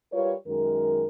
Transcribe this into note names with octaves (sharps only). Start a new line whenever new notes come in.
G3 F4 A#4 B4 C#5
F#2 D#3 G#3 A#4